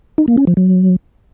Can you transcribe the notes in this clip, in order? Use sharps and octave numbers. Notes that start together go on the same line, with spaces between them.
D#4
A#3
C#4
F3
F#3